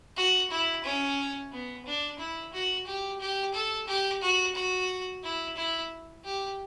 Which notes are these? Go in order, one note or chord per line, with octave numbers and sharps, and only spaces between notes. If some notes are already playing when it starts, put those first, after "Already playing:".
F#4
E4
C#4
B3
D4
E4
F#4
G4
G4
A4
G4
F#4
F#4
E4
E4
G4